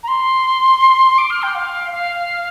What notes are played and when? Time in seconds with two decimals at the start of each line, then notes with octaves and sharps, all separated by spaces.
0.03 A#5
0.08 C6
1.18 D6
1.30 F6
1.43 G5
1.55 F5
1.92 F5